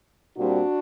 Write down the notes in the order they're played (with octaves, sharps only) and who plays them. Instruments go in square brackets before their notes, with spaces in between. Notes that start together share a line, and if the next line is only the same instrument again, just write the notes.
[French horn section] A#2 G3 C4 D4 F#4